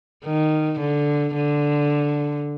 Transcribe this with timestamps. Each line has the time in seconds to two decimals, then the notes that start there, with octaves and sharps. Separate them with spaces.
0.24 D#3
0.80 D3
1.36 D3